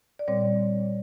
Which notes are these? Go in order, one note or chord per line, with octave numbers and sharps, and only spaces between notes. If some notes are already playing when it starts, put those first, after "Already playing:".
D5
A#2 G3 C4 C#5